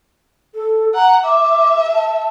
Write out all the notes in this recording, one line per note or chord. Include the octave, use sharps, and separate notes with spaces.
A4
F#5 A#5
E5 D6
A5